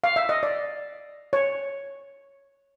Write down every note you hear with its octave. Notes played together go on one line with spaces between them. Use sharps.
F5
E5
D#5
D5
C#5